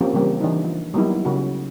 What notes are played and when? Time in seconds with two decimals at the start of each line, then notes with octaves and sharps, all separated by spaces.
0.01 F3 A#3 C4 C#4 F4 G4
0.13 C#3 E3 G3 A#3 C4
0.41 E3 D4 D#4
0.64 F3
0.94 F#3 G3 A#3 B3 D#4 E4
1.25 C#3 C#4 F#4